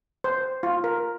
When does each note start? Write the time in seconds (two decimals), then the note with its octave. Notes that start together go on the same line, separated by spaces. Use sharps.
0.24 C5
0.63 F4
0.84 A#4